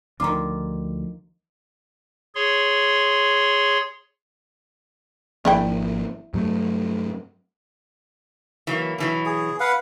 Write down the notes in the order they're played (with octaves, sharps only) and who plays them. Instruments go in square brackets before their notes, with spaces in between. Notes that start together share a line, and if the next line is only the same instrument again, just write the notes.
[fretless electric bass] D2 D4 [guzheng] D#3 F4 [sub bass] F3 [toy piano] A#5 D6
[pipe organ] G#4 C#5 C6
[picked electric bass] G#1 F3 A#3 [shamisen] D4 E4 G5
[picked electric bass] G2 F#3 A3
[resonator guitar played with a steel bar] E3 F#3 A#3
B2 E3 F#3
[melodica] G#4
B4 F5 F#5